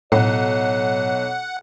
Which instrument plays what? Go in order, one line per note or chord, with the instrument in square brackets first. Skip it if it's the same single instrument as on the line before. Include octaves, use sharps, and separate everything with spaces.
[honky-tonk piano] B1 [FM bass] A2 [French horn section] C#5 [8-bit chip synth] F#5